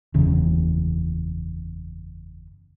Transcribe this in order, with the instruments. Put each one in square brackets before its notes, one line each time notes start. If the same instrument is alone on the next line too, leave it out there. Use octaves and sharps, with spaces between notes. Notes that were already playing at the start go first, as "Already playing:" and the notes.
[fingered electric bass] F#1 E2 C#3